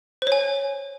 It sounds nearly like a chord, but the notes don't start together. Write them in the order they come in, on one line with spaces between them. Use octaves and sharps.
C5 C#5 G#5